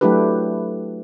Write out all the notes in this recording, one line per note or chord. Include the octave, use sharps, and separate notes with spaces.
F#3 A3 D4 E4 G4 B4